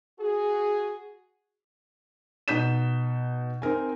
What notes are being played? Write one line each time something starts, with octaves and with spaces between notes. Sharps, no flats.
F#4 G#4
B2 D#4 G6 B6 E7
C4 D#4 A#4 G#5